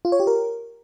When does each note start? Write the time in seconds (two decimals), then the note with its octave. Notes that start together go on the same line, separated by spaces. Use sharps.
0.05 F4
0.12 C#5
0.20 G4
0.27 A#4